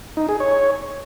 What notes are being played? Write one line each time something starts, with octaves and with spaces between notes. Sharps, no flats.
D#4
G#4
C#5